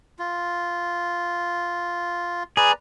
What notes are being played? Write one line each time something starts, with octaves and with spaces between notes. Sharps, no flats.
F4
G#4 B4 D5 A#5